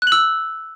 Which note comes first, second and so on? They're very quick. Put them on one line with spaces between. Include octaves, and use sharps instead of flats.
F#6 F#7 E6